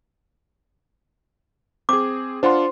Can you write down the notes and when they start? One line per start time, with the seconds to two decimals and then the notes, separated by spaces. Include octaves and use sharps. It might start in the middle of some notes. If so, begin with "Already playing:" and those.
1.89 C4 G#4 D6
2.43 D4 F4 C5 F#5 C6